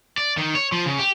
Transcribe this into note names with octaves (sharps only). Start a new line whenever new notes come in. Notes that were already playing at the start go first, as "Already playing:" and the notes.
D5
D#3
C#5
F3
C#3
G4